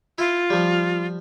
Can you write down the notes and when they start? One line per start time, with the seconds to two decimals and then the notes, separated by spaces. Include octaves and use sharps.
0.18 E4 F4
0.50 F3 G3